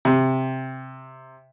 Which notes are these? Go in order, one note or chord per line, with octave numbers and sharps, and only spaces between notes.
C3